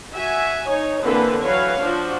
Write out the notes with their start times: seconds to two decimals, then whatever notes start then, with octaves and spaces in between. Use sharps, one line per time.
0.14 F#4 E5 G#5
0.69 D#4 C#5
1.01 D3 E3 A#3 C4 A4 B4
1.41 E3 F#3 B4 C#5 F5
1.80 F3 D4 F#4